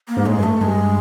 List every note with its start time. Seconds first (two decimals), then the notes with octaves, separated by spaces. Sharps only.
0.08 A#3
0.17 G#2
0.26 A2 G#3
0.38 G2
0.43 A3
0.61 G2 G#3